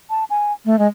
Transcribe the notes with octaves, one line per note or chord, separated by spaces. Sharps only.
A5
G#5
A3
G#3